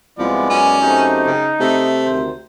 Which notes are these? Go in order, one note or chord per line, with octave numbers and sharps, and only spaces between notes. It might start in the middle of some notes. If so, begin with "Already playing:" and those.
C2 F3 G#3 B3 E4 D5
F#2 C#4
A3 C4 D#4 G4
C#3
C3 A3 D#5
D2 D#3 C5